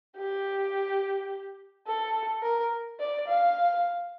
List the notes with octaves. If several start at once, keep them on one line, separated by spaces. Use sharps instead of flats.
G4
A4
A#4
D5
F5